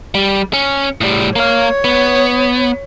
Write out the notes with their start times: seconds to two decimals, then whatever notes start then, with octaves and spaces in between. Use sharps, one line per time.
0.15 G3
0.53 C#4
1.01 A2 G3
1.36 A#3 C#5 F5
1.84 B3